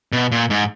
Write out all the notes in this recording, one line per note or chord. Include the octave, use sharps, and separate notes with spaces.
B2
A#2
G#2